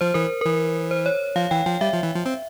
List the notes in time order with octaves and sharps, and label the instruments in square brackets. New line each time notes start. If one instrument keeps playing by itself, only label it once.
[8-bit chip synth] F3 [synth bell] C5
[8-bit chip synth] E3 [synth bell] A#4
[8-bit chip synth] E3 [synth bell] A#4
[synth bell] C5
C#5
[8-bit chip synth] F3 [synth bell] F5
[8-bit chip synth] E3 [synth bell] G5
[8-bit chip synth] F3 [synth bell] G5
[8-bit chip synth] G3 [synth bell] E5
[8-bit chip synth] F3
E3
F3
C4